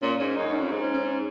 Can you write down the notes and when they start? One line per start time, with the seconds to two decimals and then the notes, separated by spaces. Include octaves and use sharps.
0.02 A#2 C#4
0.20 G#2 C#4
0.37 F#2 D#4
0.49 F#2
0.54 C#4
0.59 F2
0.71 G#2 D#4
0.82 C#4
0.94 C#4
1.05 C#4